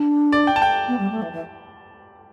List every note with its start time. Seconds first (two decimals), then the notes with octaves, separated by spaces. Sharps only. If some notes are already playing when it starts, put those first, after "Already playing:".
Already playing: D4
0.32 D5
0.47 G5
0.56 A5
0.62 G5
0.88 B3
0.99 G3
1.11 A3
1.22 E3
1.32 E3